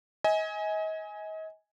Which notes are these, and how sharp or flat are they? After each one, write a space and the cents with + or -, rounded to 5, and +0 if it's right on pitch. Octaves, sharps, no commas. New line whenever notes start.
D#5 +35 G#5 +0